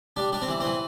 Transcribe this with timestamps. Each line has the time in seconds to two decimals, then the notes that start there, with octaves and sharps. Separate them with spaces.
0.16 G3 D4
0.32 G3 D4
0.42 C4
0.48 E3
0.60 E3 C4